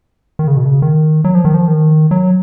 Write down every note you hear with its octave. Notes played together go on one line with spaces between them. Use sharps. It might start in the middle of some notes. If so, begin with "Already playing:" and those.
D#3
C#3
B2
C#3
D#3
F#3
F3
D#3
F3
D#3
F#3